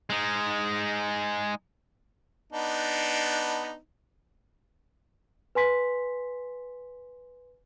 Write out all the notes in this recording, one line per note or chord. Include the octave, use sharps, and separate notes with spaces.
G#3 D#4
B3 D4 D#4
B4 G#5 C6 B6